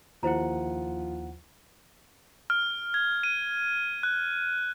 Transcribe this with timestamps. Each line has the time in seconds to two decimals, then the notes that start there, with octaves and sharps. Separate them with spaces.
0.23 D#2 F3 E4 C5 F#5 A#5
2.50 F6
2.94 G#6
3.23 D#7
4.03 F#6